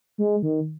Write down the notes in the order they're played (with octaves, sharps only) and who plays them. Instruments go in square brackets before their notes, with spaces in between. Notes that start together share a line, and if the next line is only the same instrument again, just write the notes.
[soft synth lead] G#3
D#3